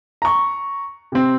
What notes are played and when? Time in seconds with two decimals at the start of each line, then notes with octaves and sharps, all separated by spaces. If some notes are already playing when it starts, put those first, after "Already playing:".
0.22 A#5 C#6
1.12 C3 C4